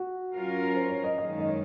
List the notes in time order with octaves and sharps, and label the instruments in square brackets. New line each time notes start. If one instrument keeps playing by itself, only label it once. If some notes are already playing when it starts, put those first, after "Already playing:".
Already playing: [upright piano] F#4
[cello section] F#3 C#4 F4 A#4 F5
[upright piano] C5
C#5
D#5
[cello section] F#2 D#3 G#3 [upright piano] D#5
[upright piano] D#5
C#5